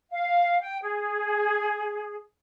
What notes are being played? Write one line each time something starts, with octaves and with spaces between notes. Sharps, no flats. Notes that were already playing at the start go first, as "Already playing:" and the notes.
F5
G5
G#4